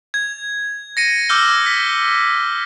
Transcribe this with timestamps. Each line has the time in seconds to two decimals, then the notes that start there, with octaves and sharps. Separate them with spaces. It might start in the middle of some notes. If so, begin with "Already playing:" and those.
0.14 G#6
0.97 A#6 C#7 D#7
1.29 D6 E6 F6 G6 G7
1.66 B6